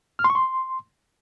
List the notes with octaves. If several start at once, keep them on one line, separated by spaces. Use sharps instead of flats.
F6
C6
C#6
C6